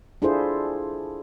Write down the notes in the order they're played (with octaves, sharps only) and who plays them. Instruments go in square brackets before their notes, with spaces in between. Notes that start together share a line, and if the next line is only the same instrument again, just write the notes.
[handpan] D4 E4 F4 G#4 A4 C5